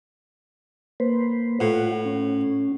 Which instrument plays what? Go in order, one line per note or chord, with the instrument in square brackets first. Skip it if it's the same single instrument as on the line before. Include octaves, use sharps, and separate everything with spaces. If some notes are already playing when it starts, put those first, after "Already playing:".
[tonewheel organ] A#3 B4 C5
[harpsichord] A2 [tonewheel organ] F4 F#5
[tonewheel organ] C#4